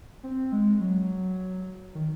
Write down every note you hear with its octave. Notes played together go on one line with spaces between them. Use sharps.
C4
G#3
F#3
D#3